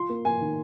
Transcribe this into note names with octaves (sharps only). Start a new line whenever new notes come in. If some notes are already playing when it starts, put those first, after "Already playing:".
Already playing: F4 C6
A#3
A#3 G#5
D#3